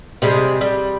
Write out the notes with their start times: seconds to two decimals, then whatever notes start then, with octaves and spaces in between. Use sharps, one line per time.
0.22 C3 G3 G#3
0.61 G3